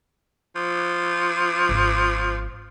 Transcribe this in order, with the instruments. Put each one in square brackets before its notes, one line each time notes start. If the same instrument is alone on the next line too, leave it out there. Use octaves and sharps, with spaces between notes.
[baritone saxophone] F3
[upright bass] G#1